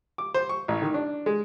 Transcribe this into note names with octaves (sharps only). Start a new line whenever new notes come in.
D6
C5
C#6
A1
D#3
D4
G#3